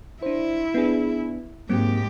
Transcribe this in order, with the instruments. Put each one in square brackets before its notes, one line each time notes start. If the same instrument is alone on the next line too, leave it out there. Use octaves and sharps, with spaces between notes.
[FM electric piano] D4 C5 [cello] E4
[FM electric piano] B3 D4 G#4
[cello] G#2 G4 [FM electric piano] F#3 A#3 C4